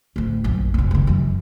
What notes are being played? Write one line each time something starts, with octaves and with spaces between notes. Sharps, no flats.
D2 A2
A#1 F#2
F1 E2
C#2 D3
F#2 E3